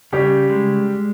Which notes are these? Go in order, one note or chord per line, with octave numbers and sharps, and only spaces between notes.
C#3 G3 G4
G#3